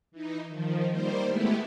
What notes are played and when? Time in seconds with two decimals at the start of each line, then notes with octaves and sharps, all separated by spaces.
0.11 E3 D#4
0.48 D#3 F3
0.89 D#3 G3 A#3 C5
1.27 G#3 A3 B3 E4 G4